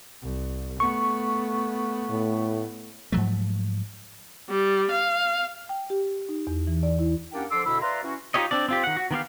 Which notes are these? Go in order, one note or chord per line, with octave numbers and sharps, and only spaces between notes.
C2
A3 B3 C#6
A2
G#2 F3 F#3 A3
G3
F5
G5
G4
D#4
E2
E3
D5
E4
A#3 C#4 D4 G4 F#5 G5
D3 F3 A4 C6 D6 E6
D2 B2 D3 E4 B5 E6
B4 D5 E5 F5 A#5 C6
E3 C#4 E4 F#4
D#4 F4 G4 C#5 D#5
C4 D4 D5
C4 F4 G4
D#3 F#5
F#4
D#3 B3 G4 F5